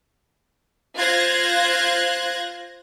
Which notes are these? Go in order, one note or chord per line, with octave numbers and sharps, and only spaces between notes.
F4 C5 F#6 G#6 A#6